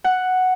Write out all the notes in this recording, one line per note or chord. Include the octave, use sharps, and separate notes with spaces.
F#5